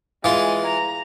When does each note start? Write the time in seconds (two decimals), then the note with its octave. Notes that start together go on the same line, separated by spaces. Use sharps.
0.24 E3 G#3 F4
0.66 A#5